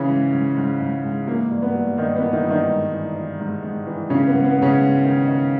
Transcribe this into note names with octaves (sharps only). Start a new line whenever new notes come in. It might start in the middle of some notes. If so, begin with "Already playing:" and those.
Already playing: C#3 E3 C#4
G#2
G#2
G#2
G#2
G#2
E3 A#3
G2
B3
G2
G2 D#3 D#4
B3
E3
D#3 D#4
G2
D#3 D#4
G#2
E3
E3
G#2
G#2
E3
G#2 C#3 C#4
B3
G#2
B3
G#2
C#3 C#4
G#2
D#3
D#3